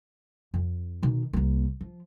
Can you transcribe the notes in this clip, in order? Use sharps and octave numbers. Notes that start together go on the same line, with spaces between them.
F2
B2 D#3
C2 A#3
F3